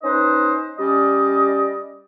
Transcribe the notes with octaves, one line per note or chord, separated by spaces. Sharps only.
C#4 D#4 B4 C5 D#5
G3 C#4 D5 D#5